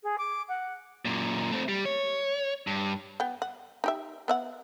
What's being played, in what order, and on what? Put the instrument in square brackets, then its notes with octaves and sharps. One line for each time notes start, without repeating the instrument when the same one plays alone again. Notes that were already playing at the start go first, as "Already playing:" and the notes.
[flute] G#4
D6
F#5
[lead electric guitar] F#2 A#2
A3 C4
G3
C#5
G2
[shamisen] B3 G5
F#5
D#4 G4 E5
B3 E5 F#5